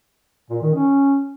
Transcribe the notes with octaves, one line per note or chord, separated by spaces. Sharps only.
A#2
D#3
C#4